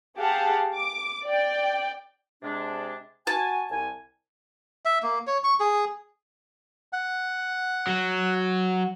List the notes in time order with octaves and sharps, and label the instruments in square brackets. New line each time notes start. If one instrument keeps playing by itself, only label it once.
[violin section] G4 G#4 F5 F#5 A5
D6
D5 G5
[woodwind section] C3 G#3 D4
[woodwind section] F#4 G#5 [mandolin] A5
[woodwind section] C2 G#5
[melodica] E5
A#3
C#5
C#6
G#4
[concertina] F#5
[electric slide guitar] F#3